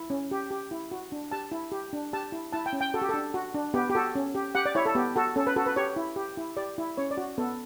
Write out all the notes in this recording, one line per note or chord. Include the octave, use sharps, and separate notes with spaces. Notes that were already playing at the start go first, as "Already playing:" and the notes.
Already playing: E4
C#4
G4
G4
E4
F#4
D4
G4 A5
E4
G4
D4
G4 A5
E4
E4 A5
G5
C#4
G5
F#4 A4
G4
D4 A4
F#4
D4
B3 G4
G4
F#4 A4
C#4
G4
G4 F#5
D5
E4 C#5
A4
B3 G4
F#4 A4
C#4 A4
B4
F#4 A4
B4
G4 C#5
E4
G4
E4
G4 D5
E4
C#4 C#5
D5
F#4
B3 A4